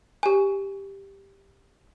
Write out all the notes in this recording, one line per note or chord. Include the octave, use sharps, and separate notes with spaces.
G4 G#5